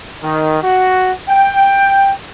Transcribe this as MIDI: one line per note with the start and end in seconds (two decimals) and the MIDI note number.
0.23 0.59 51
0.63 1.11 66
1.29 2.12 79